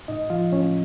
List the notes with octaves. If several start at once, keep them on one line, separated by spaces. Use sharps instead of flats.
A2 D#4 D#5
F3 F4 F5
A2 C#4 C#5